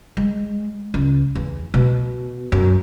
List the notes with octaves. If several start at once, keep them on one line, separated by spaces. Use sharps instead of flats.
G#3
C#2
E2
B2
F#2